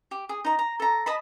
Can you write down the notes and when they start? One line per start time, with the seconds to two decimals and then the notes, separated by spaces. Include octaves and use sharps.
0.11 G4
0.29 G#4
0.45 D#4 A#5
0.59 A#5
0.80 A4 A#5
1.06 D#5 A5 B5